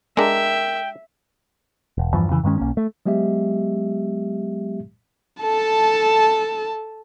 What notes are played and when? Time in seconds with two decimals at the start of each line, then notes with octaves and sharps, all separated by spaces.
0.17 G#3 D4 A#4 E5 G5
1.98 E1
2.14 E2 G2 E3 F3
2.29 F2 C#3 E3
2.44 G2 D#3 G#3 C#4
2.58 B1 A#3 C#4
2.77 A3
3.06 F#3 G#3 B3 G4 E5
5.42 A4 A5